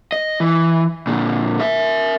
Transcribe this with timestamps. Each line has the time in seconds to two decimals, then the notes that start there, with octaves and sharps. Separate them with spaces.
0.12 D#5
0.40 E3
1.07 A#2 D3
1.60 A#4 E5